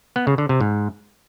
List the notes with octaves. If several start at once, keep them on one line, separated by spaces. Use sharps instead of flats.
B3
C#3
D3
C3
G#2